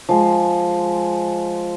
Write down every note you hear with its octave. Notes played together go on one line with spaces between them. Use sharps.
F3 G#3